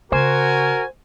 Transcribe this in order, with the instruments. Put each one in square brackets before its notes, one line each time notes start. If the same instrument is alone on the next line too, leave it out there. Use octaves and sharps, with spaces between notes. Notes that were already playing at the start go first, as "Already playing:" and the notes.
[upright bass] C#3 [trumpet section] F#4 A#4 [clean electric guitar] C5 [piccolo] G#5